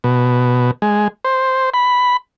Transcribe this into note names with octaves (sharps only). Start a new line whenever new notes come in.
B2
G#3
C5
B5